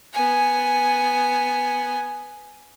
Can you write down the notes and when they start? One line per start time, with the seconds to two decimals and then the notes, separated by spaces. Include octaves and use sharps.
0.13 B3 G#5